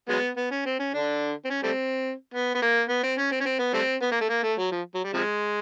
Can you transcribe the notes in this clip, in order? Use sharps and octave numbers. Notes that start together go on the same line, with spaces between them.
F#3 G#3 B3
B3
C#4
C4
C#4
D3 D4
C4
C#4
G3 A3 C4
B3
B3
A#3
B3
C4
C#4
C4
C#4
C4
B3
G3 A3 C4
B3
A#3
A3
A#3
A3
F#3
F3
F#3
G3
C3 F3 G#3